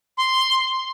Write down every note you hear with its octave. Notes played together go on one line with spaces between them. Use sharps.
C6